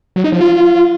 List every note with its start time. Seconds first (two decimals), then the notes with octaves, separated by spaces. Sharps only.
0.16 F#3
0.24 D#4
0.32 F3
0.41 F4